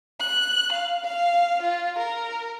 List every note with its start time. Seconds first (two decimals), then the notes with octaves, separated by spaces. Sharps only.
0.20 F#6
0.72 F5
1.04 F5
1.62 F4
1.98 A#4